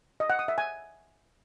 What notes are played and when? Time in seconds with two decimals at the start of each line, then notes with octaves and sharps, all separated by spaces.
0.20 D#5
0.30 F#5
0.39 D#6
0.48 E5
0.58 G#5